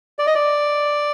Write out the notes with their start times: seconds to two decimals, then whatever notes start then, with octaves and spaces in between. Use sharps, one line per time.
0.19 D5
0.27 D#5
0.35 D5